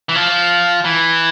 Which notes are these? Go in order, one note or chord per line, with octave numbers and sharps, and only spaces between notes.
E3
F3
E3